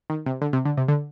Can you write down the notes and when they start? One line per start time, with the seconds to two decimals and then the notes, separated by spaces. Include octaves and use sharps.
0.10 D#3
0.26 C3
0.41 D3
0.53 C3
0.65 D3
0.77 C3
0.88 D3